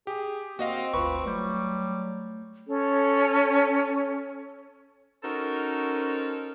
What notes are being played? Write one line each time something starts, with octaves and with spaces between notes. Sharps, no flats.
G4 G#4
A#3 C4 F#4 D#5 F5
G1 D2 F4 B4 C#6
F#3 G3 A3 G6
C#4 A4
C#4 D#4 F#4 A4 A#4 C5